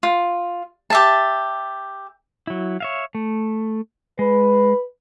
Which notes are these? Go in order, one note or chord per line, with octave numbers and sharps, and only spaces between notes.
F4
G4 E5 A5
F#3 E4
C#5 E5 F5
A3
G#3 B4